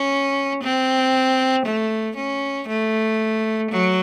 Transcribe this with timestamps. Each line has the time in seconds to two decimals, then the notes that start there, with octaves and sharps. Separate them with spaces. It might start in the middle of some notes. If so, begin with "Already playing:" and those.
Already playing: C#4
0.63 C4
1.65 A3
2.16 C#4
2.68 A3
3.71 F#3